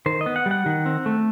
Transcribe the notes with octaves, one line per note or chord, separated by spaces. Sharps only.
D#3 C5
D#5
B3
F#5
G3
F#5
D#3
C4
A3